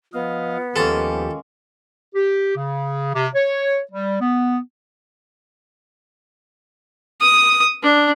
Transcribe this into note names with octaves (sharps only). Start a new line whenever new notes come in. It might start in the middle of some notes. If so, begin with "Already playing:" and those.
F3 B3 D#5 F5
D#2 F3 G#3 A#3 C#4 G4 A4
G4
C#3
C3
C#5
G3
B3
D#6
D4